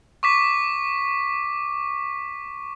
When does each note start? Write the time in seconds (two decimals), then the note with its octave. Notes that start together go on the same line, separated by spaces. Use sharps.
0.23 C#6 D6 B6